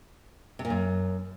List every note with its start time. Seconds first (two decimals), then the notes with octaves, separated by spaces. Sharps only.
0.59 C3
0.65 A#2
0.70 F#2